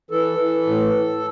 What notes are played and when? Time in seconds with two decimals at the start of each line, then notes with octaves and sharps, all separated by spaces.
0.11 E3 A4
0.38 E3
0.66 A2